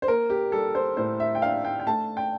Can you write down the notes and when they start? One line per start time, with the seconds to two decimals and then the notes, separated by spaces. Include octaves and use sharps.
0.02 C5
0.08 A#3 A#4
0.30 G4
0.52 G3 A4
0.75 C5
0.97 A2 C5
1.20 E5
1.35 G5
1.42 D4 F5
1.65 G5
1.80 G5
1.87 A3 A5
2.17 G5